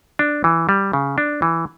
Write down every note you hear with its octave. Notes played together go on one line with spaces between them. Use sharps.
D4
E3
G3
C#3
D4
E3